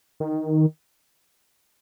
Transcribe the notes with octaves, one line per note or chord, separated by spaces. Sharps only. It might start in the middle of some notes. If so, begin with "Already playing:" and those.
D#3